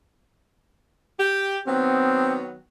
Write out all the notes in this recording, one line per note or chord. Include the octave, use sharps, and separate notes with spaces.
G4
D#3 F#3 B3 C4